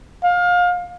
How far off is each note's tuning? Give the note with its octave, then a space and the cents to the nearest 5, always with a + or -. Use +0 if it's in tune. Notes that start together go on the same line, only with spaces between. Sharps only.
F5 +25